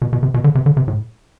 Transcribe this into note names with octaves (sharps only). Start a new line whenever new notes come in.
B2
B2
C3
B2
D3
C3
D3
C3
A2